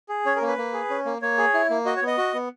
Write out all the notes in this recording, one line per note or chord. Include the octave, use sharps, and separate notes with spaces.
G#4
C#4 C#5
A#4
A#3
B4
A#3
G#4
C#4
A#3
A#3 C#5
G#4
E4
A#3
F#4 D#5
C#5
B3
D#5
F#4
B3